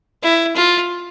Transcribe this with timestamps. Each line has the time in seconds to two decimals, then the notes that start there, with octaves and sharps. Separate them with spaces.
0.23 E4
0.56 F4